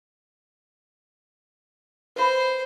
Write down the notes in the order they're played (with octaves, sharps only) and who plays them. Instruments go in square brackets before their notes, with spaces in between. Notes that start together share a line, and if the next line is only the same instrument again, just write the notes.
[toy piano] B4 E5 B5 [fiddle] C5